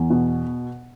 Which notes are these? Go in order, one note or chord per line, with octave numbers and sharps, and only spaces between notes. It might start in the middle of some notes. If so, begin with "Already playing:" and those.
Already playing: E2
B2